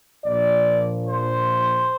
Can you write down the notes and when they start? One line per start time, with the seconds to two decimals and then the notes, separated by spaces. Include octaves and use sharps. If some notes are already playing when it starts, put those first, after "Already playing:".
0.24 A#1 A#2 F3 D5
1.05 C5